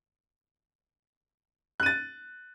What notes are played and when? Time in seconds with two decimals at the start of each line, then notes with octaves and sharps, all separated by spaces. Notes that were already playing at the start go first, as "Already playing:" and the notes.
1.80 F#6
1.83 D#7
1.86 A6